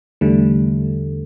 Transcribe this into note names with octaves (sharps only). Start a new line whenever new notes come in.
E2 D3 G3 A3